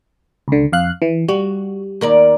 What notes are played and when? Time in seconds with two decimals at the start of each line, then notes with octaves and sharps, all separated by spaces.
0.48 C#2 D3
0.72 F2 F5 F#6
1.02 E3
1.28 G3 F#4
2.01 D#2 A#4 D5